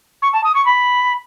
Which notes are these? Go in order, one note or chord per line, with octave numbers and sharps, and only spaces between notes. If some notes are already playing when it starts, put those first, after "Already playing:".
C#6
A5
D#6
C#6
B5